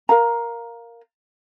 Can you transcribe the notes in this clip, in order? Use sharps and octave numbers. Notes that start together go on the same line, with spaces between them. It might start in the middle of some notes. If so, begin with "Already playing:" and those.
A#4 F5 A#5